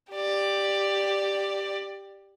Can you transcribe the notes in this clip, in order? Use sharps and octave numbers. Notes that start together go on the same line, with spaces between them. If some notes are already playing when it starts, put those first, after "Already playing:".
G4 D5